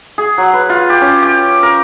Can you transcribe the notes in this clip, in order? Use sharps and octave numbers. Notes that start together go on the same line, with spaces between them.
G#4
F#3
B4
F4
G4
C#4
G4
A#4